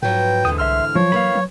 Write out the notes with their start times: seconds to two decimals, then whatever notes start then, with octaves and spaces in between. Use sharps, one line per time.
0.03 G#2 F3 F#3 B4 G5
0.45 D#2 G#2 D3 E3 D#6
0.58 C2 E5 C6 E6 F6
0.95 F3 F#3 C#5
1.12 E3 A#3 F5 B5
1.35 F#3